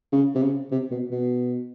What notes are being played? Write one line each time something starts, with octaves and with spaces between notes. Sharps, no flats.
C#3
C3
C#3
C3
B2
B2